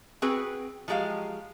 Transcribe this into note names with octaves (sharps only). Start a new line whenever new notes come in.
C4 F#4 G#4 B4 G5
F3 F#3 G#3 G4 F5